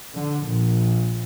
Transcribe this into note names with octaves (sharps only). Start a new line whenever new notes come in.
D3
A#1